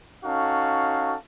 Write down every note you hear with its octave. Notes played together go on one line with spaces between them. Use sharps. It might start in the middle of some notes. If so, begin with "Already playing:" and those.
C#4 D#4 F#4 A4 F5